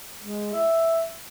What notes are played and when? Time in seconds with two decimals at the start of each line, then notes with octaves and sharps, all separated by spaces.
0.20 G#3
0.53 E5